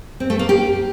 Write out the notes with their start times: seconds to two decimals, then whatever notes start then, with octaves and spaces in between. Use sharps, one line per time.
0.20 C4
0.30 A3
0.39 A#3
0.49 G4